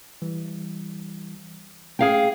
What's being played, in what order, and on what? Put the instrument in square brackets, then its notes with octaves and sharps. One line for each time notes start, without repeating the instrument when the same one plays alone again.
[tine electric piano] E3 G3
[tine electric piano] A3 C#4 [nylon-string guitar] G#4 F5 G5